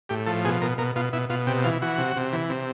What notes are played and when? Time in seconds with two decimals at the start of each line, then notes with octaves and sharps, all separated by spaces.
0.09 A2 G4
0.26 F3 A4
0.45 B2 G#4
0.62 B2 A#4
0.78 B2 A#4
0.95 B2 F4
1.13 B2 E4
1.29 B2 F4
1.46 C3 G4
1.64 E3 F4
1.82 E3 F#4
1.98 C3
2.16 C3
2.33 E3
2.50 C3